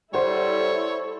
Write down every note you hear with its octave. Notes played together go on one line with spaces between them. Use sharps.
G3 E4 A4 C5 C#5 F#5